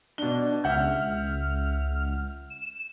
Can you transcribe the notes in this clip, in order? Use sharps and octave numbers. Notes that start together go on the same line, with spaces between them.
B2 D4 G7
C#2 E5 F#5 F6 G6
E7